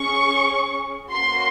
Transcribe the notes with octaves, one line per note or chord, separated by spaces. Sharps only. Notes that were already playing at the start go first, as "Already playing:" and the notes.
Already playing: C#4 G#4 C#6
A#3 C#4 F#4 C6